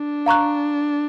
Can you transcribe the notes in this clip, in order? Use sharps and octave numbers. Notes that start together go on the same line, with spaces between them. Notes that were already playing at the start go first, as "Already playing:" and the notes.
Already playing: D4
F5 A#5 C#6 F#6